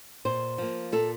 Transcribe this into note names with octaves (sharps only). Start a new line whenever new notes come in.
A#2 C5
F3 A#3
A#2 A4